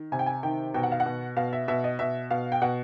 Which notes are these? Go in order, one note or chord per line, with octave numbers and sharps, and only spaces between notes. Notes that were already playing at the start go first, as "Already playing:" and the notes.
Already playing: D#3
C3 G#5
G5
G#5
D#3 G5
B2 G5
F#5
F5
F#5
B2
B2 F5
E5
B2 E5
D#5
B2 E5
B2 F5
G5
B2 F#5